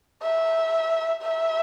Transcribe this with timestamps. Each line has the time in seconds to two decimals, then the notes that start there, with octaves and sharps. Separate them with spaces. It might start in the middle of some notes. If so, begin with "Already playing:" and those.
0.22 E5
1.23 E5